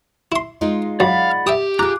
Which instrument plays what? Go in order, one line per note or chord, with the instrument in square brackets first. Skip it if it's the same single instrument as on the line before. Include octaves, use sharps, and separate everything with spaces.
[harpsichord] E4 C6
[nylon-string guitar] G#3 D#4 F4
[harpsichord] F#2 [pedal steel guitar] D5 F#5 B5 [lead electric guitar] F5
[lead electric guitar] G4 [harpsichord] E5 G5 D#6
[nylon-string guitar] F4 G#4 [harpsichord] A#5 [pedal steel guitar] D6 F#6